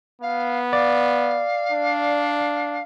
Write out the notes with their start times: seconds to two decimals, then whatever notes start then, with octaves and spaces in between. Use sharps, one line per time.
0.22 B3 F5
0.73 D5 F5
1.72 D4